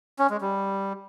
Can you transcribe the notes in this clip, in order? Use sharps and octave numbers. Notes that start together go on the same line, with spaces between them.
C#4
G#3
G3